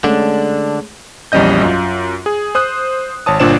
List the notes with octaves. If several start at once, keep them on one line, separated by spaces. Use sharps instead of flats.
D3 G#3 A3 C#4 D4
A#1 E2 G3 C#4 D#5 G6
F#2 F4
G#4
C5 D#6 F#6
G#1 C#5 A5 D#6
G1 A#2 D4 C5 D5 E7